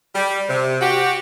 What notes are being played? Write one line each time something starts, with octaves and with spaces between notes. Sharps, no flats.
G3
C3
F#4 G4